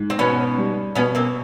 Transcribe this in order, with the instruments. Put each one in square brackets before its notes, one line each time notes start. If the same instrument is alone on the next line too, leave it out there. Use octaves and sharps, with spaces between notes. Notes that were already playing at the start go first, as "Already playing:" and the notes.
Already playing: [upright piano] G#2
[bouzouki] C4
[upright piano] B2 [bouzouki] B3 C#4
[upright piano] G3
[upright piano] B2 [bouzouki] B3 C#4
[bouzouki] A#3 C4